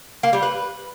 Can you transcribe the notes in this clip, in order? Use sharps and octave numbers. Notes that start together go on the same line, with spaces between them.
A#3
G3
B4